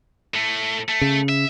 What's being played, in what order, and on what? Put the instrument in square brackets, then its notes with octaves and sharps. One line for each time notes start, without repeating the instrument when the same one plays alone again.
[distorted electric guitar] A2 A3
A3
[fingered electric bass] C#3
[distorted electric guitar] E5